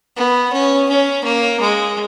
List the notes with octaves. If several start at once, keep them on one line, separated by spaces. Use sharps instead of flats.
B3
C#4
C#4
A#3
G#3